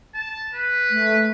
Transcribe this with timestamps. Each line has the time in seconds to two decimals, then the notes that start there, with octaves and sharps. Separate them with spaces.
0.15 A5
0.55 B4
0.90 A3